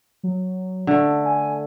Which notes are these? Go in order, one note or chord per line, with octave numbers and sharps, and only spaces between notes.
F#3
D3 A3
G#5